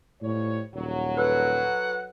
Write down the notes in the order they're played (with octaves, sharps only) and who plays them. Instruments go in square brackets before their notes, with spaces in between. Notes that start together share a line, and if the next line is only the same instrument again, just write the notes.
[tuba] A2 [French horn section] F3 G3 C#5
[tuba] D#1 [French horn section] F#3
[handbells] A4 B4 [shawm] F#5